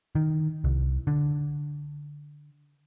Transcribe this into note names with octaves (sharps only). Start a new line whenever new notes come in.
D#3
C2
D3